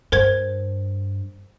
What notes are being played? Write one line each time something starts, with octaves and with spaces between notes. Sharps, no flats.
G2 A#4 C5 G#6